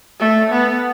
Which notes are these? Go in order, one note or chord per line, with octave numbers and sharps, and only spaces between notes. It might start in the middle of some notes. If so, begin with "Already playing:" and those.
A3
B3